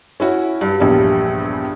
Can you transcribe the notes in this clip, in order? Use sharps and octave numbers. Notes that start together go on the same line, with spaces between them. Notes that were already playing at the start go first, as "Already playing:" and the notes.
C#4 E4 F#4
G2
A#1 E2 G2 G3